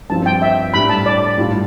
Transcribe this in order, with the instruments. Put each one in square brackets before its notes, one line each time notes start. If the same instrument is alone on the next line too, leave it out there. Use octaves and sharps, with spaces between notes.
[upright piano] G2 F3 C4 F4 [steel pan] A5
[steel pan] G5
E5
[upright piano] A2 G3 D4 [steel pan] B5
[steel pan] A5
D5
[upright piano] A2 G3 D4 F4